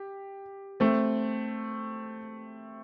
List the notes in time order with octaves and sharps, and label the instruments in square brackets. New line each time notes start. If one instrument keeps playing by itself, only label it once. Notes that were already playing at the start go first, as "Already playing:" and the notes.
Already playing: [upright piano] G4
A3 C4